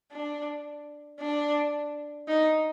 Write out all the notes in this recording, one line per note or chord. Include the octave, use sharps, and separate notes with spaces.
D4
D4
D#4